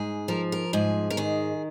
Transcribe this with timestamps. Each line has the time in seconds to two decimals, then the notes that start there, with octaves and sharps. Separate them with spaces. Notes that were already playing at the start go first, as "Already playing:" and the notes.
Already playing: G#2 G#4
0.28 F3 A#4
0.52 A#4
0.73 G#2 G#4
1.10 A#4
1.17 D#3 G#4